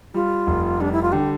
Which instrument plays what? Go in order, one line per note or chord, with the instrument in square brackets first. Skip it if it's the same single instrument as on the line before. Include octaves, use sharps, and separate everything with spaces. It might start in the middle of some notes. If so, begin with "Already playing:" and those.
[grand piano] G3 [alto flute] F4
[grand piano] F1
[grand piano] G3 [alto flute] D4
[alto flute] E4
F4
[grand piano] D3 [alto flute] G4